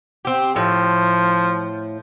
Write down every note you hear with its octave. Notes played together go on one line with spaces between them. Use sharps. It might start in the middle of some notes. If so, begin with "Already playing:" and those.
C4 G4
A2 F3